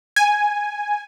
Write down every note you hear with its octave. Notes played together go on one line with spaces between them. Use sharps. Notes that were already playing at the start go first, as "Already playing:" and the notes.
G#5